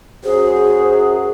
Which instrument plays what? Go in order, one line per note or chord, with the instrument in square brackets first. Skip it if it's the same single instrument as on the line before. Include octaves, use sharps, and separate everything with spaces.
[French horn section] F#2 F#4 [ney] G#4 [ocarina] C5